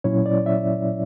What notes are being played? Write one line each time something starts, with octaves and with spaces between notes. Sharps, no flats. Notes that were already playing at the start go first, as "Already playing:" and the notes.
A#2 F#3 C#4 E4 C#5
D5
E5